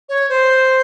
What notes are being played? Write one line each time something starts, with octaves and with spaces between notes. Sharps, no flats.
C#5
C5